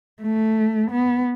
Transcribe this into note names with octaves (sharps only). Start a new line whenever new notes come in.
A3
B3